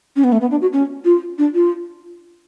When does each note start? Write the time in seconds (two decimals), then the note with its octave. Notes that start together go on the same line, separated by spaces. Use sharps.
0.16 C#4
0.24 B3
0.32 A3
0.41 B3
0.51 D4
0.62 F#4
0.73 C#4
1.05 F4
1.38 D4
1.54 F4